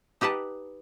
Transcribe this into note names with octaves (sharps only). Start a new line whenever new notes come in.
D#4 G4 B4 F#5 A5